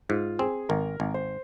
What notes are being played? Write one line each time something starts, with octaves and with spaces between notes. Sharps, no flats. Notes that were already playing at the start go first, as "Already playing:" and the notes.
G#2 F4
C4 G#4
G#1 A#4
G#1
C5